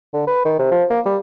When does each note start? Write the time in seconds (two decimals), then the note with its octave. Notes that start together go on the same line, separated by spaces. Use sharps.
0.13 D3
0.27 B4
0.45 D#3
0.59 C3
0.71 F3
0.90 A#3
1.05 G3